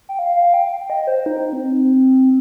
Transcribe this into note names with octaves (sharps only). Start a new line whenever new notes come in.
G5
F5
F5
G5
G5
D#5
C5
D#4
C4